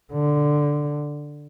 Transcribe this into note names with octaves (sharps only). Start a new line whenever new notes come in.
D3